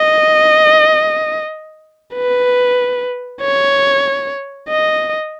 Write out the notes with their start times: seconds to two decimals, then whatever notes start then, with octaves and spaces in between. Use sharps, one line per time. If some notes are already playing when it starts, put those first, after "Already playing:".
Already playing: D#5
2.14 B4
3.42 C#5
4.69 D#5